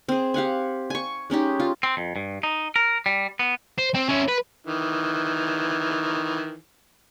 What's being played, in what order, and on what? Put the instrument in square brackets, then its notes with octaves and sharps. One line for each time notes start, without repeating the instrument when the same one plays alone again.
[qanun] C4 G#4
G4 F5 F#5 G#5
G#5 C#6
G#3 C#4 D#4 G4
F4
[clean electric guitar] C4
F2
G2
D#4
A#4
G3
B3
[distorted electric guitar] C5
C4
C#4 E4
B4
[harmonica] D#3 E3